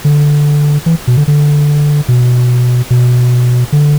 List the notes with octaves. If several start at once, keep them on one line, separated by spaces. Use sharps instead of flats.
D3
E3
B2
D3
D3
B2
B2
D3